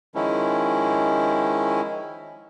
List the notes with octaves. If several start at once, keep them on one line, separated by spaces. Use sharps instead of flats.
D#3 F3 G#3 C#4 E4